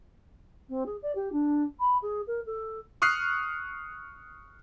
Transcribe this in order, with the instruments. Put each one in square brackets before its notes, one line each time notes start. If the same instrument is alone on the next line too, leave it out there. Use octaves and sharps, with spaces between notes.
[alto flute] C4
G#4
D5
G4
D4
B5
G#4
A#4
A4
[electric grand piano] C#6 D#6 F6 F#6 C7